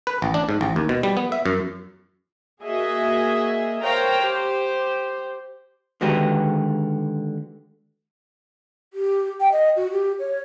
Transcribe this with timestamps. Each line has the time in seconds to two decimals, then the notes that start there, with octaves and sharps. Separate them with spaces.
0.07 B4
0.22 A1
0.34 D4
0.49 G#2
0.61 A1
0.76 D#2
0.89 B2
1.03 G3
1.17 B3
1.32 E5
1.46 F#2
2.62 A#3 F#4 G#4 D#5 E5 G#5
3.81 A#4 C5 C#5 F5 G5 A#5
4.20 G4 C5
6.01 D3 D#3 G#3 F#4 G4 B4
8.93 G4
9.40 G5
9.52 D#5
9.76 F#4
9.91 G4
10.19 C#5